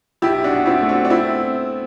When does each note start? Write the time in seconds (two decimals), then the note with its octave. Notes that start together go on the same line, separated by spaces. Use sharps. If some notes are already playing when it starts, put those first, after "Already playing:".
0.22 B1 E4 G4
0.44 D4 F#4
0.51 B2
0.66 C4 E4
0.81 A3
0.89 D4 F#4
1.05 D4
1.10 B3 C4 E4